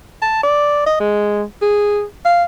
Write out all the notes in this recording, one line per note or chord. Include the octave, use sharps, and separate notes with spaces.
A5
D5
D#5
G#3
G#4
F5